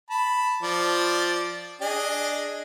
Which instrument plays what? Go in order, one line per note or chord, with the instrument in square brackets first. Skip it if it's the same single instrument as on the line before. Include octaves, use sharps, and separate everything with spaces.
[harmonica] A5 B5
F3 D5
D4 G#4 D#5